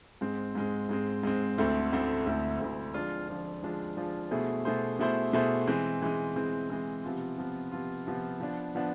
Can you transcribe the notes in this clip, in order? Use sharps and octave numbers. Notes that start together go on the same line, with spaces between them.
G#2 G#3 C4
G#2 G#3 C4
G#2 G#3 C4
G#2 G#3 C4
D2 D3 A3 C4 E4
D2 D3 A3 C4 E4
D2 D3 A3 C4 E4
D2 D3 A3 C4 E4
F3 G#3 D4 F4
F3 G#3 D4 F4
F3 G#3 D4 F4
F3 G#3 D4 F4
B2 A3 E4 G#4 C5
B2 A3 E4 G#4 C5
B2 A3 E4 G#4 C5
B2 A3 E4 G#4 C5
E3 G#3 C4
E3 G#3 C4
E3 G#3 C4
E3 G#3 C4
C3 F3 B3 F4
C3 F3 B3 F4
C3 F3 B3 F4
C3 F3 B3 F4
F3 B3 D4
F3 B3 D4